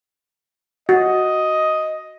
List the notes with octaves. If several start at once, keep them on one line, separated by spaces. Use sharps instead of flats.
F#4 D#5